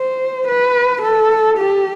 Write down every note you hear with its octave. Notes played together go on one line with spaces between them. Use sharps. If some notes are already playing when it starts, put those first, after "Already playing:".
Already playing: C5
B4
A4
G4